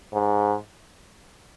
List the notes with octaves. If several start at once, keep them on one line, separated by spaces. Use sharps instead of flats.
G#2